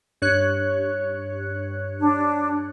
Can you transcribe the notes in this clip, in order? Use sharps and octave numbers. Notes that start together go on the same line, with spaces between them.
G2 C#5 F#6
D4